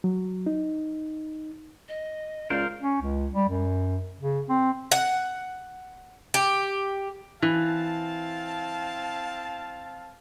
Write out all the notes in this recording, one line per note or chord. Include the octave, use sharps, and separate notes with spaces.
F#3
D#4
D#5
C#2 A#4 C5 D5 F5
C#4
C#2
G3
F#2
C#3
C4
F#5
G4
E3 C4 F5 A5